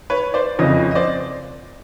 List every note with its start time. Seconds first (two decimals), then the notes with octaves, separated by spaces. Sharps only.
0.10 B4 C#5
0.34 C5 D5
0.59 F#1 F2 C#3 F3 C#5 D#5
0.91 D#5
0.95 C5 D5